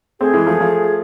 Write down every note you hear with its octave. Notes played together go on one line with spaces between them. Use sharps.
A3 C4 G#4
E3 G#3
F3 A3
F3 A3